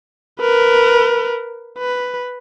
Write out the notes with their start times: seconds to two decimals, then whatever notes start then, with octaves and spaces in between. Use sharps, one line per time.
0.41 A#4 B4
1.78 B4